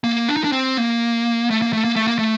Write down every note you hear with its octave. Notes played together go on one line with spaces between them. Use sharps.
A#3
D4
D#4
D4
C4
A#3
A3
A#3
A3
A#3
A3
A#3
A3